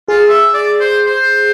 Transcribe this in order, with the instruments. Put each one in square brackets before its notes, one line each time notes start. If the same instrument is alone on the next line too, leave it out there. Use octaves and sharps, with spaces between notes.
[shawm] F4 [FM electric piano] G#4
[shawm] E5
D5
C5
C5